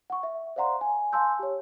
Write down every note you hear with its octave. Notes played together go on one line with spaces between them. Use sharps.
F#5 C#6
E5
C5 D5 F5 F#5 A#5 C6
G#5
F5 G#5 A5 C6 E6 G6
G4 C#5